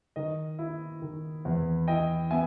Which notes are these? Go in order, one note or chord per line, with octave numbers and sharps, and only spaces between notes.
D#3 D#5
E4
D#3
E2
E4 D#5 G5
B3 E5 G#5